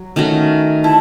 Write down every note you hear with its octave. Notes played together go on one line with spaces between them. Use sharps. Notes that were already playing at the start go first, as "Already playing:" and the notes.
Already playing: F#3
D#3 A3 C#4 F#4
E4 A5